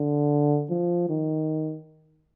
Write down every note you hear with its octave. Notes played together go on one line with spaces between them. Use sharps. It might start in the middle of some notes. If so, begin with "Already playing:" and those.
Already playing: D3
F3
D#3